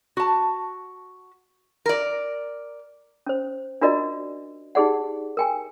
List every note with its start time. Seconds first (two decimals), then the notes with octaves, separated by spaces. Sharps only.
0.17 F#4 A5
1.86 A#4 D5
3.27 C#4 C5
3.81 D4 F4 F#4 A#4 D5 D#5
4.75 D#4 G4 G#4 D5 F#5
5.37 A#4 G5 G#5